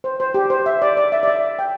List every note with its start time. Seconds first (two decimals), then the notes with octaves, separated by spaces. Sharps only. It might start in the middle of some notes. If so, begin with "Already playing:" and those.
0.04 C5
0.20 C5
0.34 G4
0.50 C5
0.66 E5
0.82 D5
0.97 D5
1.12 E5
1.23 D5
1.27 E5
1.59 G5